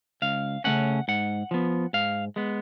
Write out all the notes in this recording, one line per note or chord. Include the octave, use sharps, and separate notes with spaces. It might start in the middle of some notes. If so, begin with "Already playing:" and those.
C#2 F5
C#3 F#3 A3 C#4 F#5
G#2 F#5
F3 B3
G#2 F5
G#3 B3